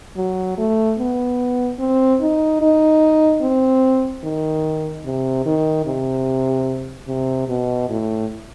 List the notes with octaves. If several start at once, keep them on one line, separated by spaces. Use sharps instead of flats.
F#3
A3
B3
C4
D#4
D#4
C4
D#3
C3
D#3
C3
C3
B2
A2